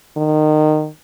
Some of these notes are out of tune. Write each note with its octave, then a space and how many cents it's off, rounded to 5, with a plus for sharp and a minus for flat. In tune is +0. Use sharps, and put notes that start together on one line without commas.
D#3 -20